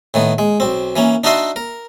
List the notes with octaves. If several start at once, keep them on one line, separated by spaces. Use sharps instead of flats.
A2 D#3 B3
G#3
B1 C4
E3 A#3 C#4
D4 D#4 F#4 D#5 E5 C6
A#4